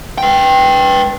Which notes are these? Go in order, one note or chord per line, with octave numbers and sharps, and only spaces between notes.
B4 G5